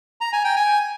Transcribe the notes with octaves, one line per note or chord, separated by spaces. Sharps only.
A#5
G#5
G5
G#5